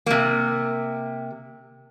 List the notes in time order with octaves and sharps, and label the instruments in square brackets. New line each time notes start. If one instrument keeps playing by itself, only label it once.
[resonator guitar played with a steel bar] C3 A#3